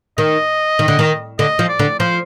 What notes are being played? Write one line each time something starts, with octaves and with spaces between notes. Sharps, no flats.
D#3 D#5
D#3
D3
D#3
D3 D#5
F3
D5
D3
F3 C5